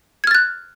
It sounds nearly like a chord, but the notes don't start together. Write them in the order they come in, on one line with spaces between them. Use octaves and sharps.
G#6 F6 A6 F#6